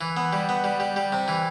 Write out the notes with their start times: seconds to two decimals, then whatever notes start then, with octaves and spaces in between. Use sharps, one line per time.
0.01 E3
0.17 B3
0.33 G3
0.49 B3
0.64 G3
0.80 G3
0.96 G3
1.12 C3
1.28 E3